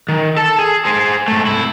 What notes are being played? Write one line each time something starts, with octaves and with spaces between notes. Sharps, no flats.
D#3
A4 A5
G#4
G#4 C5
G#2 A3
C2 E4